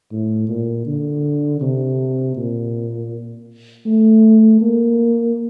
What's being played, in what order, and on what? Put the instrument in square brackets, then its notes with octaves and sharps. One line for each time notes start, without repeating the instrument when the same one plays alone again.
[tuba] A2
A#2
D3
C3
A#2
A3
A#3